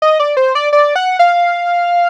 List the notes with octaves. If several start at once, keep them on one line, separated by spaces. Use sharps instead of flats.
D#5
D5
C5
D5
D5
F#5
F5